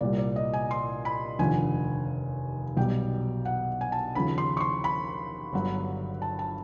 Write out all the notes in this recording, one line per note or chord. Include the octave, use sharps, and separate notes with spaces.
C2 A#2 G3 D5
D5
D#5
G#5
C6
B5
F1 D#2 D3 F3 G#5
B1 B2 G3 G5
F#5
G#5
A5
D#2 C#3 F3 B5
C6
C#6
C6
B5
G1 G2 D3 F#3
A5
A5